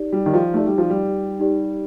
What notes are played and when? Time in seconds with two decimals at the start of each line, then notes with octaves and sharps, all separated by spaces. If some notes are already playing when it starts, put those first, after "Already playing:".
Already playing: D#4 G4 D5
0.13 G3
0.26 D#3
0.34 F3
0.54 A3 D#4 G4 D5
0.66 G3
0.78 F3
0.90 G3
1.39 D#4 G4 D5